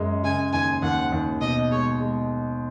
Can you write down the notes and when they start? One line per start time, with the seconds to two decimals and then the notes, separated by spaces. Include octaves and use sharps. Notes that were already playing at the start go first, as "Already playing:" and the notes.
Already playing: F#2 G#3
0.23 C#3 G#5
0.53 D#2 G#5
0.82 D#2 F#5
1.12 D#2
1.41 B2 D#5
1.71 G#3 C#5
2.00 G#3